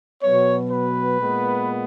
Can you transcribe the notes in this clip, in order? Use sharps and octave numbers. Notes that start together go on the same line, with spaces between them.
B2 F#3 B3 C#5
B4
A#2 G#3 B3